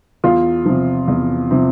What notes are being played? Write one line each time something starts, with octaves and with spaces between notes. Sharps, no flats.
E2 F4
C3 F3
E2
C3 F3